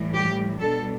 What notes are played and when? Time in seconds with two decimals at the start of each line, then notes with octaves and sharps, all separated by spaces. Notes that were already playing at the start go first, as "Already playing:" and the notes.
Already playing: A2 E3 G3
0.13 G4
0.60 B2 G3 D4 A4